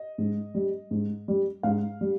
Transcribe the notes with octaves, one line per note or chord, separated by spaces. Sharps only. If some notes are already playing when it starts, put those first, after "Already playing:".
Already playing: D#5
G#2
G3
G#2
G3
G#2 F5
G3